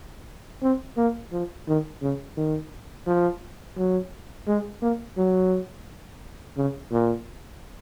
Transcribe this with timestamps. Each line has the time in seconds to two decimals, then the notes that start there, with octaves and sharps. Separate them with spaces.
0.63 C4
0.97 A#3
1.32 F3
1.68 D#3
2.02 C#3
2.37 D#3
3.07 F3
3.77 F#3
4.47 G#3
4.82 A#3
5.17 F#3
6.56 C#3
6.91 A#2